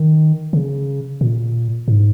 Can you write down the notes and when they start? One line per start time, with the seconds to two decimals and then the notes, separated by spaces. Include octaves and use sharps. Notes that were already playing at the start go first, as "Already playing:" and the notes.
Already playing: D#3
0.53 C#3
1.21 A#2
1.88 G#2